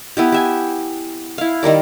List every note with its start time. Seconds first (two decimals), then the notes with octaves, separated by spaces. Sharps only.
0.17 B3 E4 G4
0.32 G4 E5 G#5
1.38 E4 F5
1.63 D#3 G3 A#4 D5